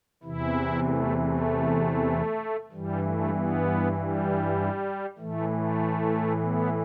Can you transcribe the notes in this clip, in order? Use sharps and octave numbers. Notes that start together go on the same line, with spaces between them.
E2 C3 E3 E4
A3
A3
G2 E3 G3
A3
B3
G3
A2 E3 A3
A3
B3